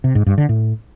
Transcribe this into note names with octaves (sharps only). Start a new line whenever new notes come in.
C3
G#2
G2
D3
A2